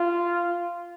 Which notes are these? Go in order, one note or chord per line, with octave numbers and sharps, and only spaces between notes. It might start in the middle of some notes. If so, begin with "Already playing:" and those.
Already playing: F4